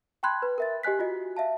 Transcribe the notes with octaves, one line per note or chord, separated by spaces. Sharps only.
G5 A5 B5 C6 F#6 G#6
B4
A#4 E5 A6
G4 D#5 G#5 F#6 B6
F4 F#4 D#5
E5 F5 A5